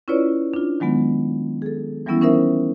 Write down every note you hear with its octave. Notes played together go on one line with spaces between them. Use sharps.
C#4 E4 F4 B4 C#5 D5
D4 F4
D#3 F#3 G#3 B3
G#4 A4
E3 F#3 G3 B3 C#4 E4
C#4 D#4 A#4 C5 E5